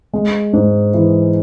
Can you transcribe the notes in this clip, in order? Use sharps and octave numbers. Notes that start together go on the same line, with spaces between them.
G#3
G#2
E3